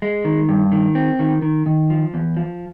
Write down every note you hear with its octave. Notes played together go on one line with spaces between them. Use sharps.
G#3
D#3
G2
D#3
C4
D#3
D#3
D#3
F3
E2
F3